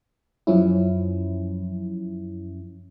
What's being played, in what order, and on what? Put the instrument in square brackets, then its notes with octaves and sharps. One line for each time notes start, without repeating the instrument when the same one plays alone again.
[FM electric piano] F#2 F3 C#4 E4